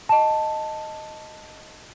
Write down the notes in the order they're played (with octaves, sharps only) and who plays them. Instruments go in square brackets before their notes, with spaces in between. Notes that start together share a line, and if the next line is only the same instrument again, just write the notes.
[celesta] D#5 A5